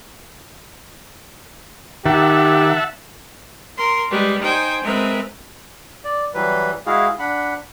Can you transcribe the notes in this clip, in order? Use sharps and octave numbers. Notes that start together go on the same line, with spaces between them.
D#3 G4 E5 F#5 A5
A#4 C6
G3 G#3 B4
D#4 C5 G5 G#5
G#3 C4 A#4 B4 E5
D5
E3 F#3 G3 B4
G#3 E4 F#4 G#4 F5
D4 F#5 B5